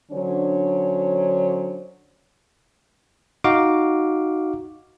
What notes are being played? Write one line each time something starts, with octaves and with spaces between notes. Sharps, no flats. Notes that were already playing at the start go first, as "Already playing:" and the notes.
D3 F#3 C#4 D4 C5 C#5
D#4 F#4 F5 D6